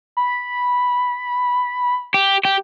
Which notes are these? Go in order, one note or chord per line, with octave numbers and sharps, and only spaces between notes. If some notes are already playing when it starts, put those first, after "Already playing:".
B5
G4
G4